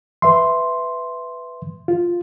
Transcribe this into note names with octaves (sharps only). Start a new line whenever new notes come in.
B4 E5 C6
F4